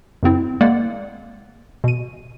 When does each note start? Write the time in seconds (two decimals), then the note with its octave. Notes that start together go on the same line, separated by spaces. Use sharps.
0.23 F#2 C#3 C4 E4
0.61 G#3 A#3 D5 F#5
1.84 B2 D#7